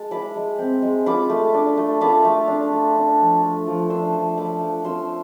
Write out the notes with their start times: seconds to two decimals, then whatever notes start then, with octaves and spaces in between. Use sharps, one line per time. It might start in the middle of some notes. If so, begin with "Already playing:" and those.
Already playing: G#3 A5
0.11 E4 B5 D6
0.36 G#3
0.59 C4
0.82 G#3
1.06 F4 B5 D6
1.30 A3
1.54 D4
1.77 A3
2.01 F4 B5 D6
2.25 A3
2.48 D4
2.72 A3
2.96 D4
3.20 F3
3.43 A3
3.67 F3
3.90 D4 C6 E6
4.15 F3
4.37 A3 B5 D6
4.61 F3
4.84 F4 C6 E6